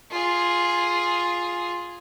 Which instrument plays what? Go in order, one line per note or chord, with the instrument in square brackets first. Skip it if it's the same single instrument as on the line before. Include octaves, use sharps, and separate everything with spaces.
[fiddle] F4 G#4